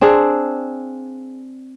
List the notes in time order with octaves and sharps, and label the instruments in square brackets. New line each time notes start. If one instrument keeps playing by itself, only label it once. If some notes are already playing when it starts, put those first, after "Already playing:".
[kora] C4 D4 G#4 F5